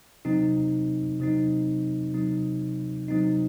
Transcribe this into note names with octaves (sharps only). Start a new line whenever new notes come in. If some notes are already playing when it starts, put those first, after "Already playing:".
C3 F#3 C4 D#4
C3 F#3 C4 D#4
C3 F#3 C4 D#4
C3 F#3 C4 D#4